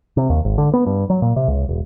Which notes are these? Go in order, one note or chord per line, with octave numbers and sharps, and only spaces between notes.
C3
D#2
G#1
D3
B3
G2
F#3
A#2
C3
C#2
E1